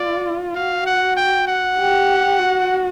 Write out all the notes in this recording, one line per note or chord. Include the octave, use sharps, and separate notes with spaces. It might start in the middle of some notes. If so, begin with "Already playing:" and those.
Already playing: F4 D5
F#4 F5
F#5
G5
F#5
G4
F#4